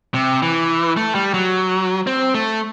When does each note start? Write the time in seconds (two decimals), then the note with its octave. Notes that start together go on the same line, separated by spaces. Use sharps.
0.14 C3
0.42 E3
0.97 A3
1.15 G3
1.34 F#3
2.07 C4
2.35 A3